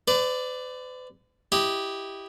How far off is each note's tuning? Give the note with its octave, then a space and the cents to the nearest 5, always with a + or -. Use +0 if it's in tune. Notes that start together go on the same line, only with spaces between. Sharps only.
B4 +45 D5 +0
E4 +0 G4 +0 D#5 +0